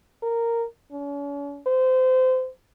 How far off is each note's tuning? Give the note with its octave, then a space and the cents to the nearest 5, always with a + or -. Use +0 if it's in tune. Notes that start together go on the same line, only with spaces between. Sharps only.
A#4 -10
C#4 +45
C5 -25